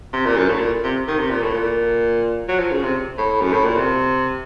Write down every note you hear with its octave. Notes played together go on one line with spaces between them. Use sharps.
C3
A#2
F#2
A2
A#2
C3
D#3
C3
A#2
A2
A#2
F#3
F3
C#3
C3
A2
F#2
A2
A#2
C3